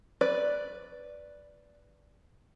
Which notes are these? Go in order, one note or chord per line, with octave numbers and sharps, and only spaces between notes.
B4 D5